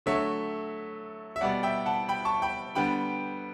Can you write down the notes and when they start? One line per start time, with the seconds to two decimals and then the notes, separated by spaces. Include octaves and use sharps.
0.06 D3 F#3 A3 C#5 E5
1.36 E5
1.41 B2 G3 B3 D5 F#5
1.63 E5 G5
1.86 F#5 A5
2.09 G5 B5
2.25 A5 C#6
2.42 G5 B5
2.75 D3 G3 B3 G5 B5